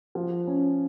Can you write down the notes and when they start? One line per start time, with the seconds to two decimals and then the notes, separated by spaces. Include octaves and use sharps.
0.15 F3
0.47 C#4